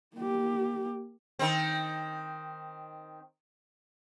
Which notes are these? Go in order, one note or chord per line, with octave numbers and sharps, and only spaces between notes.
A#3 G4
D#3 C4